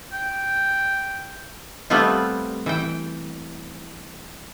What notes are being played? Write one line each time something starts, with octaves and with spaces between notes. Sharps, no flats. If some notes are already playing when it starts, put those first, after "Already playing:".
G5
G3 A3 B3 C4 F4
E3 G5